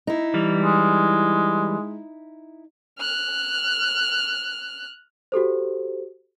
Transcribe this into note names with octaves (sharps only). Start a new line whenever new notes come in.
D#4 E4
E3 G3
G#3
F6 F#6
F#4 G4 A4 C5